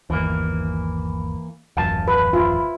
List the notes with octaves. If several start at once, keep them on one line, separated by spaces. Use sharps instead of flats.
G1 D#2 E3 A#3
D#1 A1 F#2 F5 A5
B4
E4 F4